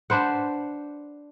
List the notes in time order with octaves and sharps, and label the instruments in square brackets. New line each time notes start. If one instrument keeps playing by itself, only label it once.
[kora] D4 B4 C5 F#5